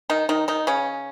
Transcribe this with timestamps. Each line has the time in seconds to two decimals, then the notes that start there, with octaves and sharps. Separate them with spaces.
0.10 D#3 D#4
0.29 D#3 D#4
0.48 D#3 D#4
0.67 C#3 C#4